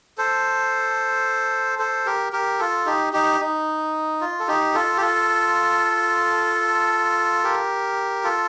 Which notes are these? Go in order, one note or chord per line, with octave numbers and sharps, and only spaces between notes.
A4 C5
A4 C5
G4 A#4
G4 A#4
F4 A4
D#4 G4
D#4 G4
D#4
F4
A4
D#4 G4
F4 A4
G4
F4 A4
G4 A#4
F4 A4